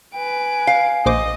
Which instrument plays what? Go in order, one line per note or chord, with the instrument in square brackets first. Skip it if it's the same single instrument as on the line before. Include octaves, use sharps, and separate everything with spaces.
[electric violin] B4 D7 [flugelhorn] G#5
[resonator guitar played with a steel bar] F5
[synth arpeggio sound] A#1 C5 D6 [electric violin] D#5